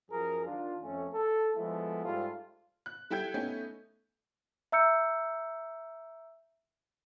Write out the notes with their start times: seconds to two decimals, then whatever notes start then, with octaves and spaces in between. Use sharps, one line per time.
0.11 F#2 F3 G#4 A#4
0.46 D#3 D4 F4
0.83 F2 A3 C#4
1.13 A4
1.57 F3 G#3 A3 B3 E4
2.05 G#2 G3 A3 F4
2.86 F#6
3.10 G3 E4 A4 G5 G6 G#6
3.34 A3 B3 C#4 D#4
4.72 E5 A#5 E6 G6 C#7